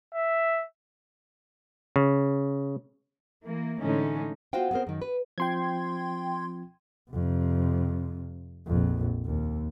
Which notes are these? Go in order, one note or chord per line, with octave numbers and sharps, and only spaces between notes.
E5
C#3
E3 A#3
A2 D3 E3 G#3 C#4 D#4
B3 F4 F#4 C5 F5 G5
B3 C4 G#4 A#4 C5
F#2 D#3
B4
F3 C4 F4 G5 C6 G#6
F2 C3
A#1 F2
D#2